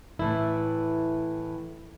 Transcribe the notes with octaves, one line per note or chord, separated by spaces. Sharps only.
A2 E3 A3 E4